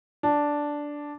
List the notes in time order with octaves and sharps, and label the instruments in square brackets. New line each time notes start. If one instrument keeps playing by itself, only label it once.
[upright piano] D4